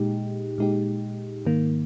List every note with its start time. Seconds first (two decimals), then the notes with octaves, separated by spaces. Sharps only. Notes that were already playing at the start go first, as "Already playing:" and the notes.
Already playing: A#2 G#3 D#4 G4
0.58 A#2 G#3 D#4 G4
1.45 G#2 D#3 A#3